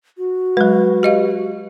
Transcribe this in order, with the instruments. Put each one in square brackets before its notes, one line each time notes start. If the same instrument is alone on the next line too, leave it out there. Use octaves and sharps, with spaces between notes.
[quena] F#4
[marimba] F#3 G#3 [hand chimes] B4
[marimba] G4 D#5 F5